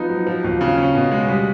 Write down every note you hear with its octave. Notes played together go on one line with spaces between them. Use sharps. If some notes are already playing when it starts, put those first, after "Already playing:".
Already playing: F3 B3 D#4
F#3
F3
D#2
C#3
C#4
B2
G#3
G3